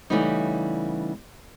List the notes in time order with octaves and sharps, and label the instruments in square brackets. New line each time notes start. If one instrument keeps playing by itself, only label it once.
[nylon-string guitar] C#3 E3 G3 A3 B3 D#4